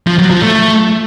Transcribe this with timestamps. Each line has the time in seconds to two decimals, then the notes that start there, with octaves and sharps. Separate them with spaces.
0.07 F3
0.19 F#3
0.30 F3
0.42 A3